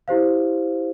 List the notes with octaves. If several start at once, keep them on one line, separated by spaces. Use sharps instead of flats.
E4 G4 C5 F5